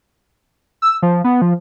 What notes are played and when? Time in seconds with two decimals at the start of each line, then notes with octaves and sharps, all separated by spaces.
0.82 E6
1.03 F3
1.24 B3
1.42 F3